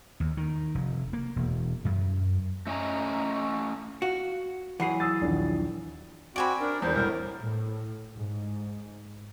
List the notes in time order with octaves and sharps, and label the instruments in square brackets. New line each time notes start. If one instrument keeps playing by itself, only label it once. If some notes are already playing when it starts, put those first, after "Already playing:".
[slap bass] D#2
D#3
F1
A#3
E1
F#2
[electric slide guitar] A3 C#4 D#5 G#5 A#5
[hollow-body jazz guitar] F#4 [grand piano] F5
[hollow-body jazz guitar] E3 F#3 G#4 [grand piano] F#5 B5 C7
[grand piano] D#6 E6 A6
A#1 D#2
[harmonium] C4 F#4 [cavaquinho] D5 G#5 B5 [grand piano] D7
[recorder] D4 [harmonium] A#4
[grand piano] E2 [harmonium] D#3 G3 [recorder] C5
[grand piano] E1 C2 G3 [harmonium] A2 A#4
[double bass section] A2
G#2